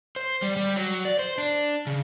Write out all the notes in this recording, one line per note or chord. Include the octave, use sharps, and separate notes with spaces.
C5
G3
G3
F#3
D5
C5
D4
C#3